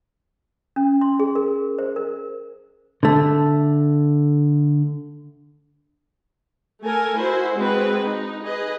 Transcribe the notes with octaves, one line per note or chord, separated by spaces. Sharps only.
C#4
C6
G#4
A#4
C5
A#4
D3 A3
A3 A4 A#4 G#5
E4 F#4 C5
G#3 C4 F#4 B4
D#4
G#4 B4 D#5